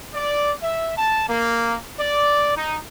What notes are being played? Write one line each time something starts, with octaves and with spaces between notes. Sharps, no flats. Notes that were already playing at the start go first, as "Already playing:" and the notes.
D5
E5
A5
A#3
D5
D#4